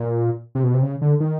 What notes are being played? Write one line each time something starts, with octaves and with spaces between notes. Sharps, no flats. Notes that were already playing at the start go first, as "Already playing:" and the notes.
Already playing: A#2
C3
B2
C3
C#3
D3
D#3